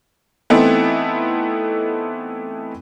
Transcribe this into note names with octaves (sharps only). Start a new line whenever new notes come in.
E3 A3 B3 C4 D#4 E4